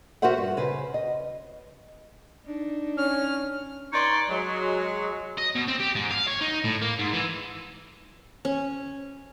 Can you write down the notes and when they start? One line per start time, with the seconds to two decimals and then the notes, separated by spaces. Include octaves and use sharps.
0.22 F#4 G4 A#4 C5 E5 F#5
0.38 G2
0.57 C#3 B4 C5
0.94 D#5
2.45 D4 D#4
2.97 C#4 F6
3.92 D#4 B4 C#5 D5 C6
4.29 F#3 G#3
5.38 D#5
5.55 B2
5.68 C4
5.80 G4
5.95 G#2
6.11 F5
6.28 C#5
6.41 D#4
6.64 A2
6.82 A#3
6.99 G#2
7.13 E3
8.45 C#4